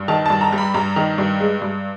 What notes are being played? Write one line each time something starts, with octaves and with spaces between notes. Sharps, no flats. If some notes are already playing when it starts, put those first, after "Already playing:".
Already playing: G2
D#3 A5
G2 A5
A#5
G3
B5
G2 A#5
D#3
G2
G#3
G2